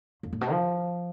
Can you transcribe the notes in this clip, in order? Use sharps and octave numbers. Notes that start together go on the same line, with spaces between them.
F2
A2
B2
F3